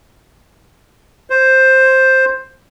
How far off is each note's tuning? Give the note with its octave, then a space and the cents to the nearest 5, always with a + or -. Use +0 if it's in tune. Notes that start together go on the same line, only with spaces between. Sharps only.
C5 +5